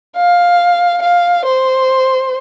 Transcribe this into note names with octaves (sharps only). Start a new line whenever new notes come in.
F5
F5
C5